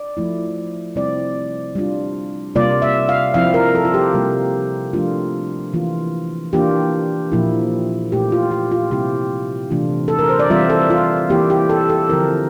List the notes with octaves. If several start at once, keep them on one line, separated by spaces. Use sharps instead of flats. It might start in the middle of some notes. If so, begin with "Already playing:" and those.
Already playing: D5
F3 A3 E4
C3 G3 C4 E4 D5
G3 D4 F4
C3 G3 A#3 F4 D5
E5
F5
F3 C4 E4 F5
A#4
A4
F4
G4
C3 G3 A#3 F4
F3 A3 D4 F4
E3 A#3 F4
E3 A#3 D4 F4 G4
A#2 F3 A#3 E4
A#2 A3 E4 G4
F4
G4
F4
C3 G3 C4 E4 G4
C3 E3 A3 D4 F4
A4
A#4
C5
D5
E3 G3 C4 F4 E5
A4
F4
E3 A#3 E4 G4
G4
A4
A4
D3 F3 C4 E4 A#4